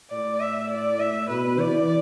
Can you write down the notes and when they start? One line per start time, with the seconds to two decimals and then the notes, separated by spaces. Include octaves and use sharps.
0.11 A2 D5
0.41 E5
0.70 D5
1.00 A2 E5
1.30 B2 B4
1.59 E3 D5